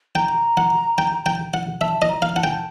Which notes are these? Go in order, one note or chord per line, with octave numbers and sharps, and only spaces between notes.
G5 A#5
F#5
G5
G5
F#5
E5 A5
D#5
A#5
F5
F#5 A5
G5 G#5
A5